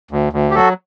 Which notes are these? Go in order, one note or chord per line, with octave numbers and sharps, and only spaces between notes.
D2
D2
G4
F#3 F#4 A4